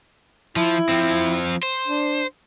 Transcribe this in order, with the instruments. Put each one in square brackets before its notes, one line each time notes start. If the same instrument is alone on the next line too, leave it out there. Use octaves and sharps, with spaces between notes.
[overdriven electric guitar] F3 [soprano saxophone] E4
[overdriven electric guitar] F3 C4
C5
[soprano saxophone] D4